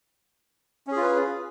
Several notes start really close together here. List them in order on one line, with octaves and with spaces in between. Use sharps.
C#4 G#4 F4 B4